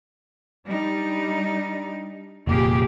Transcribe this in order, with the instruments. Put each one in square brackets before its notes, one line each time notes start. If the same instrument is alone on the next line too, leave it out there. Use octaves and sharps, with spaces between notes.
[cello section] G3 D4 D#4
[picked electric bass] F1 A#2 [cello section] A#3 G4 G#4